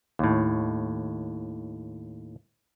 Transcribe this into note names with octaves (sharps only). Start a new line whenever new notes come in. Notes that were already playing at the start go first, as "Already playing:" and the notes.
D#2 A2